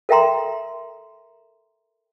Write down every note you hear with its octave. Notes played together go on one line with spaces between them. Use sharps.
A4 A#4 E5 G5 A#5 C6